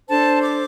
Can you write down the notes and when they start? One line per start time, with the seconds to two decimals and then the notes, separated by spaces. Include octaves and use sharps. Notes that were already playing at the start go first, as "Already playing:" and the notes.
0.08 D4 A4 C5 A5
0.43 D6